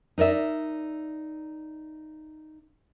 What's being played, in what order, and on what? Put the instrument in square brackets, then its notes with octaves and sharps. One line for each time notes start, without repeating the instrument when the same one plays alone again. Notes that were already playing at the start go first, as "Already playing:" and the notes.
[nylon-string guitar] D#4 A#4 D5 E5